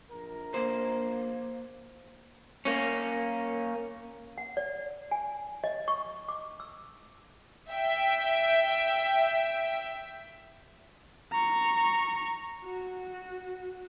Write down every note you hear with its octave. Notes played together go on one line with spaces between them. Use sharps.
A#1 A#4
A#3 C5
A#3 C#4
F#5
D5
G#5
D#5
C#6
D6
E6
E5 G5
A#5 C#6
F#4